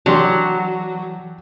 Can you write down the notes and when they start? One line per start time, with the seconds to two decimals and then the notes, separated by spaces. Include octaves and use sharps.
0.06 E3 F#3 D4 G4 C6